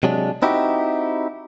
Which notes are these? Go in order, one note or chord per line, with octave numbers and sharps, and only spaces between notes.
C3 F#3 G#3 D4
C4 D#4 E4 F#4 G4